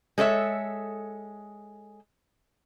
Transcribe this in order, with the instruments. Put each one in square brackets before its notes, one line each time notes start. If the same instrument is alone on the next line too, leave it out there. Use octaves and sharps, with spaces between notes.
[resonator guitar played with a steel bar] G#3 A4 C#5 E5